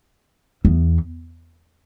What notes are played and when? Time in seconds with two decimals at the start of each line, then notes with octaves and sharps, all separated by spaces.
0.65 E2